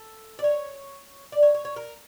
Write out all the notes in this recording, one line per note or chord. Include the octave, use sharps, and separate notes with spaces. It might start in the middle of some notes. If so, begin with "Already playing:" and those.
Already playing: A4
D5
C#5
D5
C#5
C#5
C#5
A#4